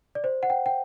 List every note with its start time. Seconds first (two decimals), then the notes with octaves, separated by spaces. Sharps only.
0.15 D5
0.24 C5
0.43 F#5
0.50 G5
0.66 G5